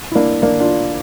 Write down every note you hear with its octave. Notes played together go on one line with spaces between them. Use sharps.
E4
A#3 D4
A#3 D4
D4 F4